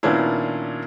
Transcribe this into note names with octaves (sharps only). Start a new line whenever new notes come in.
A#2 D#3 B3 C#4 D4 E4